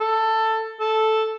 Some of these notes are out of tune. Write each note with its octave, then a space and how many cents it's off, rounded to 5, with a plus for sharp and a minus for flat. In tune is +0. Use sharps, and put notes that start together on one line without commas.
A4 +15
A4 -5